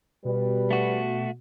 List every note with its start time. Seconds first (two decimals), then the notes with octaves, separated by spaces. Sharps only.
0.25 B2 G3 B4
0.71 A3 F#4